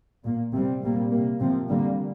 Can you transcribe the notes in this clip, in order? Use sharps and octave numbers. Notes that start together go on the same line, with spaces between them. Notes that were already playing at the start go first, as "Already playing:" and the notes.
A#2 A#3
C3 G3 C4
A#2 G3 A#3
C3 A#3
C3 F3 C4
D3 G3 A#3